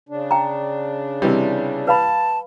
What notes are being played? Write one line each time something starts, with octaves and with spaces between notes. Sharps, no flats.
C#3 D4
G5 A#5
C3 E3 G3 D#5
B4 F5 A5 B5